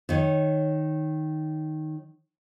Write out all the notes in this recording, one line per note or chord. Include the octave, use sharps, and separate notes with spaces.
D#3 C#5